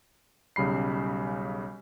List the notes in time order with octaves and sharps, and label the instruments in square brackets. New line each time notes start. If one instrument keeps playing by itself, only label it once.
[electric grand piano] B1 C#3 G3 B5 C7